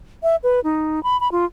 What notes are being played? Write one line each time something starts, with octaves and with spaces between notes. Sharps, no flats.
E5
B4
D#4
B5
B5
F4